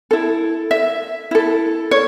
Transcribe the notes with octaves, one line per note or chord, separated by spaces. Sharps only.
E4 A4
E5
E4 A4
C#5